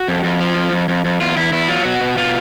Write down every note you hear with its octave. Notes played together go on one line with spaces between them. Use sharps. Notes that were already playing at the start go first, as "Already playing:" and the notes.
Already playing: F#4
F2
F2
F3
F2
F2
F2
F2
E2 F4
E2 E4
E2 E4
F#3 F4
B2 F#4
B2
B2 F4